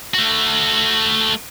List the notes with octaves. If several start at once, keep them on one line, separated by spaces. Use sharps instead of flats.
A3 F#4